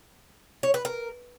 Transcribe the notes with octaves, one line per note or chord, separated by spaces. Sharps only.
C#5
B4
A#4